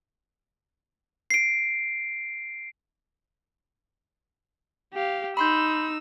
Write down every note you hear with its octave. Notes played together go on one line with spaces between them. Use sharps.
C7 D7
G4 F5
D#4 B5 C6 E6 G6